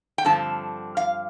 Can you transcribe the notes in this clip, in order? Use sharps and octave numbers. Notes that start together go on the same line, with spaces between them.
G5
G2 D3 F3 C4 A5
F5